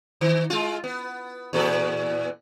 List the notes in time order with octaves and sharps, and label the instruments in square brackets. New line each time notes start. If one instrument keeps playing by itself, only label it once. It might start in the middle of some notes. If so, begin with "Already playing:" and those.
[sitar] D#3
G#3 F4
B3
E2 A#2 A4